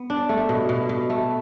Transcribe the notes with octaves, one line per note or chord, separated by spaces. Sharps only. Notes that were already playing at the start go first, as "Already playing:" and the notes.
Already playing: B3
D4
A3
B2
B2
B2
A3